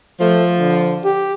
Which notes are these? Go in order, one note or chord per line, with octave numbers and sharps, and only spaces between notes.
F3 A3
D3
G4